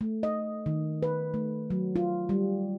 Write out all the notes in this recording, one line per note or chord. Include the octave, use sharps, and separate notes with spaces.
A3
D#5
D#3
B4
A3
F#3
F4
G3